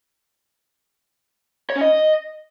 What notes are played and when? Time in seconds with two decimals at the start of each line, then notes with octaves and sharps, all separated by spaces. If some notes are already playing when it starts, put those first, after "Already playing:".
1.70 C#5
1.75 C#4
1.81 D#5